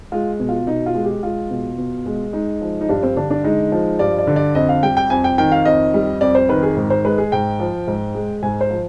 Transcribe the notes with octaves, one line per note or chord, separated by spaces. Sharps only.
G#3 F4
B2
F4
B2 D#4
F4
G#3
G4
G#3 F4
B2
B2
G#3
G#3 D#4
F3
D#4
G2 D4
C4
D3 D4
D4
G#3 D#4
F3
G2 D5
D5
D3
D5
F2 D#5
F5
G3 G5
G5
F2 G#5
G5
D#3 G5
F5
F2 D#5
G3
F2 D5
C5
D#3 B4
G#4
G#2
C5
G#3 B4
G#4
G#2 G5
F3
G#2
G#3
G#2 G#5
C5
F3